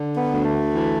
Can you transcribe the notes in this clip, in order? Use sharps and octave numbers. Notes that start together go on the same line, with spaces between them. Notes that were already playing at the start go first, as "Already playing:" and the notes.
Already playing: D3
B3
D2
A3
E3